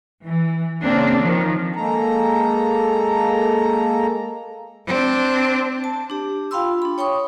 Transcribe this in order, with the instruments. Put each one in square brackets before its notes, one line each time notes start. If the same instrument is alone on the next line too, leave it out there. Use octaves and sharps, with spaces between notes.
[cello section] E3
C#3 A#3 C4 D4
D#3 F3
[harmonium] G#3 A#3 A4 A#5
[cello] C4 D4
[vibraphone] A5
D4 G4
F4 F5 G5 B5 C6 E6
D4 B5
C#5 G5 B5 C#6 D#6